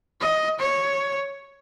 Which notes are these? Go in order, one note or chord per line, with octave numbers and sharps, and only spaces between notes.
D#5
C#5